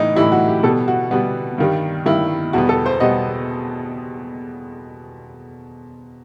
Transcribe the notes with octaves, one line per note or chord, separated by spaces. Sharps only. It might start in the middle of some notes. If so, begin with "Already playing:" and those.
Already playing: A2 E3 G3 D#4
A2 E3 G3 E4
F#4
G4
B2 G3 B3 A4
F#4
B2 G3 B3
G2 D#3 G3
G2 D#3 G3 E4
E2 B2 G3 B3 F#4
A4
C5
B2 G3 B3 D#5